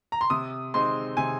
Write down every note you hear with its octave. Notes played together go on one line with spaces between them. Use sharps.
A#5
C6
C3 D#6
G#3 C4 D#4 C6
C3 G#5